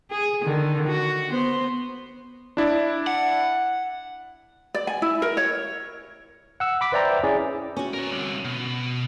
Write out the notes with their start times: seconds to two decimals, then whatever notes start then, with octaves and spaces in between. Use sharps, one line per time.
0.11 G#4
0.44 D3 D#3
0.87 F#4
1.30 B3 C5
2.57 D4 E4 D5
3.07 F#5
4.74 D5
4.87 G#5
5.02 E4
5.22 A#4
5.37 C#5
6.60 F#5 E6
6.81 B5 D6 B6
6.92 B4 C5 D5 E5 G5 A#5
7.24 C#4 E4 G#4 D5
7.77 C#4 F#4
7.94 A#4 C#5
8.12 C2 D3
8.45 B2